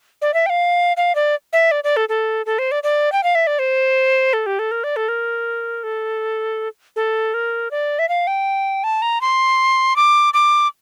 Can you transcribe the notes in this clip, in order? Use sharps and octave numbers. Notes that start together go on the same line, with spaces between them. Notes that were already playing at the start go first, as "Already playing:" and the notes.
D5
E5
G5
F5
F5
D5
E5
D5
D5
A4
A4
A4
C5
D5
D5
G5
F5
E5
D5
C5
A4
G4
A4
A#4
D5
A4
A#4
A4
A4
A#4
D5
E5
F5
G5
A5
A#5
C6
D6
D6